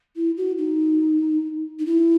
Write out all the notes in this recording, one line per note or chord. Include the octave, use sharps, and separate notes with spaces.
E4
F#4
D#4
D#4
E4